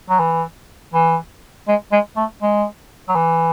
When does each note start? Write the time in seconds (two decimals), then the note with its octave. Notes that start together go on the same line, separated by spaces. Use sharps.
0.10 F#3
0.20 E3
0.94 E3
1.68 G#3
1.92 G#3
2.17 A3
2.42 G#3
3.09 F#3
3.15 E3